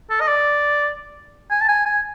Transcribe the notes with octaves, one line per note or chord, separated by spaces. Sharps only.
A4
D#5
D5
G#5
A5
G#5
G#5